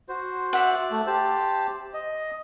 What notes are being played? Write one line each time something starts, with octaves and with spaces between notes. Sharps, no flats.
F#4 C5
D5 E5 F#5
A3
G4 C5 A5
D#5